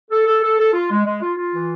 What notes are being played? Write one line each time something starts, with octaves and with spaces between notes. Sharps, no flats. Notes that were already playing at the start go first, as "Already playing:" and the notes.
A4
A4
A4
A4
F4
G#3
G#3
F4
F4
E3